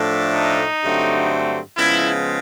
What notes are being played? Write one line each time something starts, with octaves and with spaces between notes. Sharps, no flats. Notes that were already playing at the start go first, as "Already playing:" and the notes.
Already playing: A2 F3 A3 D4
D#4
G2 D3 F#3 A3 C4
C#3 F3 G#3 B3 E4